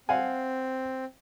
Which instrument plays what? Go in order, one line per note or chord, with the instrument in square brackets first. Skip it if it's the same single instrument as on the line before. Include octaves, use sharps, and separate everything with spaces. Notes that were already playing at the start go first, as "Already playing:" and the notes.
[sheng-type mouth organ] C4 [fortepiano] F5 F#5 G#5